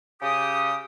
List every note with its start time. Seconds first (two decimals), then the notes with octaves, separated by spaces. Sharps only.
0.22 C#3 G4 D#6